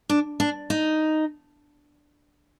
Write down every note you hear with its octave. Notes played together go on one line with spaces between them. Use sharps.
D4
D4
D#4